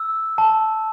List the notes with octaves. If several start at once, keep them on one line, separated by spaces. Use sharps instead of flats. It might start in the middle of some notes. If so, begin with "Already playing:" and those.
Already playing: E6
A5